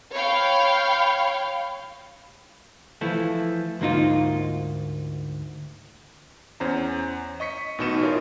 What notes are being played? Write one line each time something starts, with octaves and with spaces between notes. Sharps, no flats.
C#5 F5 G5 B5
E3 F3 A3
D2 G#2 A#3 D#4 F4
E2 C#4 C5 A#5
D#5 C#6 B6 C#7
A1 B2 D#4 C#6 E7
E4 F4 A#4 C#5